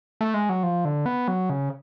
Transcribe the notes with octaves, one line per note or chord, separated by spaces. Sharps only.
A3
G#3
F#3
F3
D3
B3
F#3
C#3